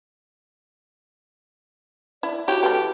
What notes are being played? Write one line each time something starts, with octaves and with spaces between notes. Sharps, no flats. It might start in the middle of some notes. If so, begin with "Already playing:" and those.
E4 D5
E4 F#4 G4 C#5
E3 A3 G4